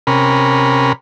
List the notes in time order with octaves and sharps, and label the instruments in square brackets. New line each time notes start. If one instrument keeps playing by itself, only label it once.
[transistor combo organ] C3 C#4 A#4 B5